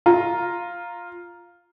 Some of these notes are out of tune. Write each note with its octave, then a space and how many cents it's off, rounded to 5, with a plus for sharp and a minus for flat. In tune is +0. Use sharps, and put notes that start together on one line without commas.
F4 +0 A#5 +0